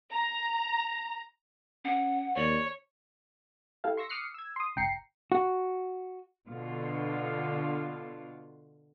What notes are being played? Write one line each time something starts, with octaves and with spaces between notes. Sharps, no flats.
A#5
C#4 F#5
D#2 C#5 D5
E4 G4 A4 F5
C6 C#6 E6 A#6
D6 D#6 F6 F#6 C7 C#7
E6 G#6
C6 D#6
G1 C#2 G5 A#5 C7 C#7
F#4
B2 D3 F4